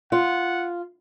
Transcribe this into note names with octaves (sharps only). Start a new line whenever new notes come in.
F4 F#5